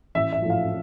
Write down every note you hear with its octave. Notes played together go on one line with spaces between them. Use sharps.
A1 E5
E5
A2 F3
F5